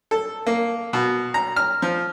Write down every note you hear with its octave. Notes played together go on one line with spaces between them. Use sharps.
A4
A#3
B2
A#5
F6
F3